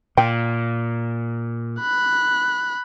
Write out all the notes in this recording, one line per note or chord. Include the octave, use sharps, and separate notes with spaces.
A#2 G5
B5 F#6